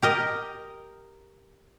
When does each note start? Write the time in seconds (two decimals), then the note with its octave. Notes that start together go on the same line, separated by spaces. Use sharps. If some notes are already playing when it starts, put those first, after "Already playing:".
0.02 G4 A#4 D#5